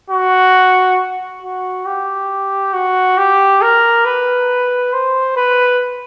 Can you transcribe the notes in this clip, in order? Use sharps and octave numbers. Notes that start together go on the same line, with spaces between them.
F#4
F#4
G4
F#4
G4
A#4
B4
C5
B4